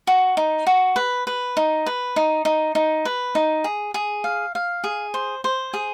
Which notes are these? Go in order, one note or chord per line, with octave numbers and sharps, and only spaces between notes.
F#4
D#4
F#4
B4
B4
D#4
B4
D#4
D#4
D#4
B4
D#4
G#4
G#4
F5
F5
G#4
C5
C5
G#4